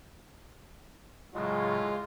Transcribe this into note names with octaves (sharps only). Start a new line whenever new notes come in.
A2 C#3 F#3 G#3 F4